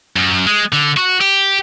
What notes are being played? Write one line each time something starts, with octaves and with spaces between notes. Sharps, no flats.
F#2
G#3
D3
F#4
G4